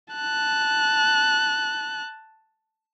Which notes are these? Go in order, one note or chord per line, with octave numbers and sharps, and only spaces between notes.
A5 F#6